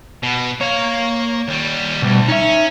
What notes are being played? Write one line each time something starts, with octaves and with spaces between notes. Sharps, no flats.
B2
A#3 C#5 F5
D#2 G3
D2 B2 G3
C#4 D#4 E5